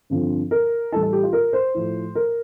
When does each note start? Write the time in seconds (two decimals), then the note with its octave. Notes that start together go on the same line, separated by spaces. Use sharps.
0.10 G2 D3 F3 C4
0.51 A#4
0.92 A2 E3 G3 A4
1.03 A4
1.13 G4
1.23 F4
1.33 A#4
1.53 C5
1.74 A2 F3 A3
2.15 A#4